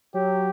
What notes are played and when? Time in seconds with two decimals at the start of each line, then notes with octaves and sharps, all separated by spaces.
0.14 F#3 G4